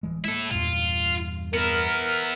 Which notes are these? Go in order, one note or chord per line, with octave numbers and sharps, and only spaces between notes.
D1 E3 G#3
G#3 A#3 E4 A4
E2 G2 A#2 F4
B3 E4 A#4